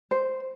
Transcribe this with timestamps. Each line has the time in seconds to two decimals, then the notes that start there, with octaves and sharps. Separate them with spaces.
0.11 C5